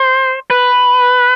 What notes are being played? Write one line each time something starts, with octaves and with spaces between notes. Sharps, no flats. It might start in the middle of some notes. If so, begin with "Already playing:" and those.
Already playing: C5
B4